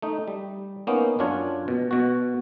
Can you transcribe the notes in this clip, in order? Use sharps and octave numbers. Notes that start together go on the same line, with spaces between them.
A3 D#4
G3
A#3 B3 C#4 D#4
F#2 C#4 D4 F4 C#5
B2
B2 F#4